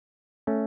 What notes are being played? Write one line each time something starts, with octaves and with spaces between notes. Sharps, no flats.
A3 C#4